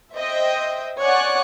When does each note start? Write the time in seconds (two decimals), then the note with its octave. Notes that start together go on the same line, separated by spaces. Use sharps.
0.17 C5 D#5 E5 G5
1.02 C#5 D5 F#5 G#5 C#6 F#6